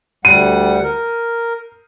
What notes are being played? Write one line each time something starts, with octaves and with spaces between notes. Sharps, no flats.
D2 G3 F#5 D#7
A#4